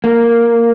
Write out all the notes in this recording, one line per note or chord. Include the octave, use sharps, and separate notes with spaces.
A#3